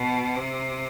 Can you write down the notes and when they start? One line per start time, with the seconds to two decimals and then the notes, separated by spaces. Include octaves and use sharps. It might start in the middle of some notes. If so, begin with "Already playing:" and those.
Already playing: B2
0.35 C3